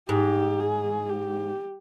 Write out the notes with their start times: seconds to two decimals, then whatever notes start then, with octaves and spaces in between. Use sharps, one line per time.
0.09 G#2 G4
0.60 G#4
1.09 G4